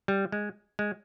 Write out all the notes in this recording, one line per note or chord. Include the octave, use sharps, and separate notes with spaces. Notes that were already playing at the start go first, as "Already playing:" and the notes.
G3
G#3
G#3